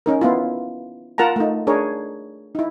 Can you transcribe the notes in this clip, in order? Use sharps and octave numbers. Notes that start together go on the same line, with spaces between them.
C#4 D#4 A#4
B3 E4 F4
F4 A#4 F#5 A5 A#5
A3 D#4
D4 G#4 A#4 C#5
D#4 E4